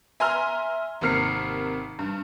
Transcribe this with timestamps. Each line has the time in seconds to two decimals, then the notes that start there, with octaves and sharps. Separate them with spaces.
0.20 E5 G#5 A#5 C6 E6 F6
1.01 G#1 C3 A#3 F6 C7 C#7
1.99 G2